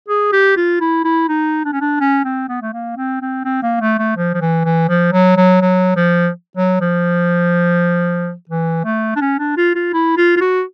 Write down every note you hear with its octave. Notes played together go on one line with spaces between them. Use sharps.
G#4
G4
F4
E4
E4
D#4
D4
C#4
D4
C#4
C4
B3
A3
A#3
C4
C4
C4
A#3
A3
A3
F3
F3
E3
E3
F3
F#3
F#3
F#3
F3
F#3
F3
E3
A3
D4
C#4
D4
F4
F4
E4
F4
F4
F#4